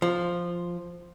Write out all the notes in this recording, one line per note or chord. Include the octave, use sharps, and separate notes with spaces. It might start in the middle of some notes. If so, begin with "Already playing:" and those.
F3